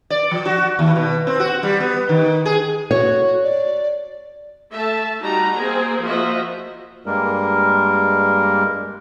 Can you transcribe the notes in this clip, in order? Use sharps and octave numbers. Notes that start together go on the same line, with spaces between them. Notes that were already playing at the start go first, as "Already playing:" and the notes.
D5
F3
F#4
D#2
B2
C4
F#4
G3
B3
D#3
G#4
F#4 C#5
D5
A3 E5 A5
G3 D#4 F#4 A5 A#5
A#3 C4 G#4
F3 A#3 F#4 D#5 E5
G2 G3 G#3 A#3 A#4